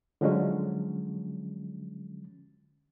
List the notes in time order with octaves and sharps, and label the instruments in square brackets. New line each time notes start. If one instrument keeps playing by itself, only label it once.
[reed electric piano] D3 F3 F#3 G#3 C#4